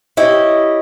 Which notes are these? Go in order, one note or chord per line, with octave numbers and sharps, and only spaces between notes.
E4 G4 C#5 D#5